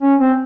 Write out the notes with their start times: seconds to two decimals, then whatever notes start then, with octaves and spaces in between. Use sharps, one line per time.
0.02 C#4
0.19 C4